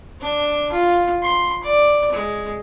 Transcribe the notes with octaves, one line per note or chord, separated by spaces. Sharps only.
D4
F4
C6
D5
G#3